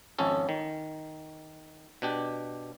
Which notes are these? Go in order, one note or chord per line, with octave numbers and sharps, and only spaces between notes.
G#1 F2 C#4 A4
D#3
B2 D4 G4